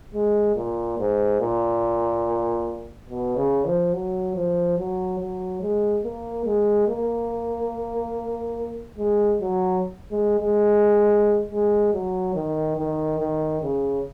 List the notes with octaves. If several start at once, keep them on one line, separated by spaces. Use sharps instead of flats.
G#3
A#2
G#2
A#2
B2
C#3
F3
F#3
F3
F#3
F#3
G#3
A#3
G#3
A#3
G#3
F#3
G#3
G#3
G#3
F#3
D#3
D#3
D#3
C#3